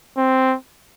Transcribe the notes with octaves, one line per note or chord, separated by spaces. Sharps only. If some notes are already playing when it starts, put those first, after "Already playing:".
C4